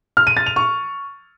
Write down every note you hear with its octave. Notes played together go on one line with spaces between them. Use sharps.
F6
D#7
A6
F7
C#6